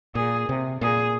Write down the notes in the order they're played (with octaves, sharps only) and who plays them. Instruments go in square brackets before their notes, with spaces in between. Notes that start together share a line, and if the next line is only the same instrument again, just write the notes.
[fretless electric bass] A#2 [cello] G#4
[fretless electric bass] C3
[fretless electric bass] A#2 [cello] G#4